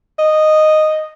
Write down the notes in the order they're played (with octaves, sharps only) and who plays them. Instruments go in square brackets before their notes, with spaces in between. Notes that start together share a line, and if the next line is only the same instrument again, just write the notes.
[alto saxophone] D#5